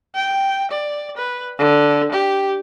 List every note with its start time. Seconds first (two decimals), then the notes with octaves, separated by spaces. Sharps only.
0.15 G5
0.71 D5
1.17 B4
1.58 D3
2.12 G4